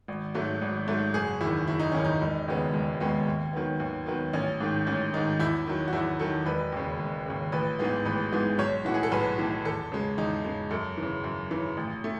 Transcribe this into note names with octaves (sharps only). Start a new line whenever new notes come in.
G#1
G#2 F#3 A3
G#1
G#2 F#3 A3
F#1 G#4
E2 D#3 E4
F#1 E4
D#4
E2 D#3 C#4
D#4
E1
D#2 C#3 G#3 B3
E1
D#2 C#3 G#3 B3
D#2
D#3 F#3 B3
D#2
D#3 F#3 B3
A1 C#4
G#2 D#3
A1 C#4
G#2 D#3 D#4
E2 E4
D#3 F#3
F#4
E2 E4
D#3 F#3 A4
E1 B4
D#2 C#3
E1
D#2 C#3
A1 B4
G#2 E3 G#3 B3
A1 B4
G#2 E3 G#3 B3
B1 C#5
A2 E3 F#4
G#4
A4
B1 B4
A2 E3
E2 A4
C#3 G#3
E2 D#4
C#3 G#3
F#2 A4
C#3 E3
F#2
C#3 E3
A1
A3